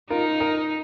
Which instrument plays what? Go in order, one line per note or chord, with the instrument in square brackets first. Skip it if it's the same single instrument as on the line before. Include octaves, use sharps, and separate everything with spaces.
[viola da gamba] D#4 [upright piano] F4 A#4
[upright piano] A#4 D#5